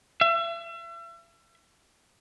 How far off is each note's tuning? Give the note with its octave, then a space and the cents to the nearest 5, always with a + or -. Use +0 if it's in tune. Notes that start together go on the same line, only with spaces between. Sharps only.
E5 +40